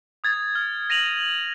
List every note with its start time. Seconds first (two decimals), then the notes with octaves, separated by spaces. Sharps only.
0.24 D#6 G#6 A6
0.55 F6
0.90 A#6 D#7 F7 F#7